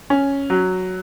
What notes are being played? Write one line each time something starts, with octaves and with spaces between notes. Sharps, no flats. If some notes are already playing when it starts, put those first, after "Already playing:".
C#4
F#3